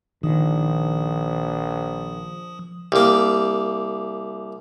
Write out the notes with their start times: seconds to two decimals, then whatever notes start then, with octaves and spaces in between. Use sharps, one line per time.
0.23 A#1 D#3 F3 D#6
2.92 C2 A#3